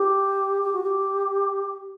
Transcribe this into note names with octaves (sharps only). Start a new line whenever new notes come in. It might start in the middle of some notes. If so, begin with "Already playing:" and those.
Already playing: G4
G4
F#4
G4